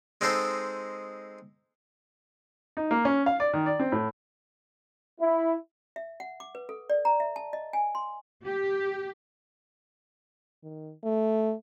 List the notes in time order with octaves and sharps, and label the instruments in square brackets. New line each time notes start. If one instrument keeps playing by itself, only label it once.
[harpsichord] G#3 C4 D#4 A4 C5
[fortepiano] D#4
A#3
C#4
F5
D5
D#3
D5
C4
A2
[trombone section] E4
[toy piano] E5
F#5
D6
B4
A4
D5
A#5
E5
A5
D#5
G#5
C6
[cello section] G4
[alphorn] D#3
A3